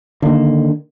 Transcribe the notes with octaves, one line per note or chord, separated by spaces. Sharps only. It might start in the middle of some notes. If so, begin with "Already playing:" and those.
D3 D#3 A#3